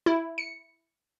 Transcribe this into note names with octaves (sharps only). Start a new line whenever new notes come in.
E4
C#7